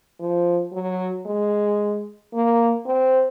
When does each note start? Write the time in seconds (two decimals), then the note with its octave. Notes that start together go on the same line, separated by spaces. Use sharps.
0.20 F3
0.73 F#3
1.26 G#3
2.33 A#3
2.86 C4